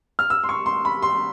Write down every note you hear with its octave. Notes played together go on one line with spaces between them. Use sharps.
F6
E6
C6
C#6
C6
B5
C6